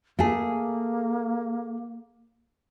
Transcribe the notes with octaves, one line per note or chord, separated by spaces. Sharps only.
A3 A#3 G#4